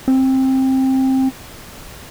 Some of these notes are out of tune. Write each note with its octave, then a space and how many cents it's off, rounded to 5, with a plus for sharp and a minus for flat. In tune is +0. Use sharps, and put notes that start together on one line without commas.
C4 +15